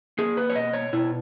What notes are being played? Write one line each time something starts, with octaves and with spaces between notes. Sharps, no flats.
A#3 G#4
B4
C#5
B2 D#5
C#5
B2 E4